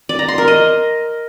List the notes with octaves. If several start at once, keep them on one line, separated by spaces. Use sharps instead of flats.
D5
A#5
C6
A#4
D#5